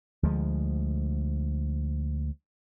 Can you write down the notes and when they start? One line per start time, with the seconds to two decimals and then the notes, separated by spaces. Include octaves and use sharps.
0.23 D2 F3 G#3